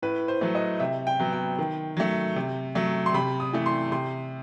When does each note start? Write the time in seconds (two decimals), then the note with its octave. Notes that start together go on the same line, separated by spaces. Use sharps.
0.02 A2 B4
0.28 C5
0.41 F#3 A3
0.55 D#5
0.80 C3 E5
1.07 G5
1.20 F#3 B3
1.33 G5
1.59 D#3
1.97 F#3 A3
2.36 C3
2.75 F#3 A3
3.06 C6
3.14 C3 B5
3.40 D#6
3.53 E3 A3
3.66 C6
3.92 C3 C6